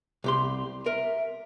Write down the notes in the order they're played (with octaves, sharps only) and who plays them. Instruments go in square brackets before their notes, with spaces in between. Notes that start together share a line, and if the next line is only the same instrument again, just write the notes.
[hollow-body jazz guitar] C2 G4 C6
[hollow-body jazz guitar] A#4 [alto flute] E5